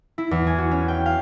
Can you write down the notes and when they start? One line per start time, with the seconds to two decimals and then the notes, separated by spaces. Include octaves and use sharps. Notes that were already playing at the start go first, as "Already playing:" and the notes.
0.18 E4
0.31 E2
0.47 G#5
0.58 F#4
0.71 C#4
0.88 G5
1.06 F5